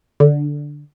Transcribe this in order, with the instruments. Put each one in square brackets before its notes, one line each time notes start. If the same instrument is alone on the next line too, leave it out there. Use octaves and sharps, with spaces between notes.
[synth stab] D3